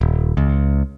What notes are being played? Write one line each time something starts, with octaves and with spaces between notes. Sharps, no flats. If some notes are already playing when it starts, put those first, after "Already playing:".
D#1
C#2